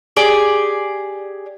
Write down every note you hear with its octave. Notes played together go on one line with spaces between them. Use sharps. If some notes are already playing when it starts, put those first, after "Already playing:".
G4 G#4 D5